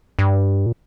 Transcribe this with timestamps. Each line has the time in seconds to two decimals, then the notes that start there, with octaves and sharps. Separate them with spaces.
0.19 G2
0.66 A#2